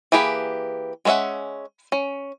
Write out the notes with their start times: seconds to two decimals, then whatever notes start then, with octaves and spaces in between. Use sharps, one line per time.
0.12 E3 A#3 G4 G#4 B4
1.05 G#3 B3 C#4 E5 F#5
1.92 C#4